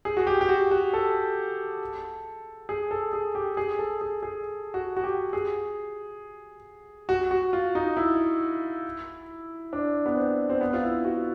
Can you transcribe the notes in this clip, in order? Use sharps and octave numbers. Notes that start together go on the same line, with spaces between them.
G#4
F#4
G4
G4
F#4
F#4
A4
G#4
A4
G#4
G4
G#4
A4
G#4
G#4
F#4
F#4
G4
G#4
F#4
F#4
F4
D#4
E4
D4
B3
C4
C4
B3
F4
E4
F#4